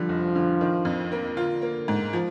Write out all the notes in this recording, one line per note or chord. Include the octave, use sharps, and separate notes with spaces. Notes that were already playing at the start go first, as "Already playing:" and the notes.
Already playing: D3 F3 G3
F1
D3
D#3
F2
A#3
D3 F4
A#3
G#2
F3